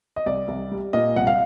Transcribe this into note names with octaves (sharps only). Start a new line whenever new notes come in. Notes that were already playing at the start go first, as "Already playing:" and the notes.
D#5
C2 D5
C2
G3
A#2 D#5
C2 F#5
F5